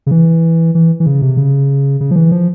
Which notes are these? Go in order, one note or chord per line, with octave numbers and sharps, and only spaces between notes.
C#3
E3
E3
E3
C#3
C3
C#3
C#3
F3
E3
F3